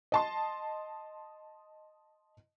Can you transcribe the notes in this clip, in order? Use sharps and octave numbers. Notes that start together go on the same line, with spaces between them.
D#5 A5 C6